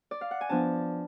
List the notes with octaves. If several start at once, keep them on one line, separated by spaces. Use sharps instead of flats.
D5
F5
F#5
G#5
F3 B3 D4 A5